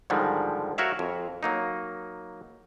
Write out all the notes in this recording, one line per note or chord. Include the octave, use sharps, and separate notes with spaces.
G#2 D3 D#3 F3 G3 G#3
F#4 A#4 C#5 E5 F5
F2
F#3 A#3 D#4